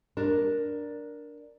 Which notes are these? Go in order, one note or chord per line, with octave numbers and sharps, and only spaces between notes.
D4 A#4